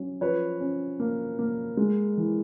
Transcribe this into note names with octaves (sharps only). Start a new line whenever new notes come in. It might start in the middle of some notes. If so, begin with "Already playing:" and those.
Already playing: F#3 C#4
F3 B4 C#5
C#4
A#3
A#3
G#3
E3